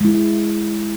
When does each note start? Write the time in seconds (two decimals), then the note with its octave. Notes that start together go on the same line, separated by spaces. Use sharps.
0.01 G#3 E4